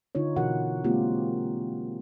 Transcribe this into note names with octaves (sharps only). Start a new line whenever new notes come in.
D3 D#4 F4 C#5
B2 E3 F#4 A#4 F#5
G#3 A#3 C4 F4 G4